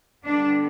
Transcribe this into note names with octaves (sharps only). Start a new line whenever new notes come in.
D3 G3 B3 D4